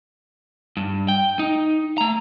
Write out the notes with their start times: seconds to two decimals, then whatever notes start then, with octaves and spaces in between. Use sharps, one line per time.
0.77 G2
1.08 G5
1.39 D#4
1.98 A3 A#5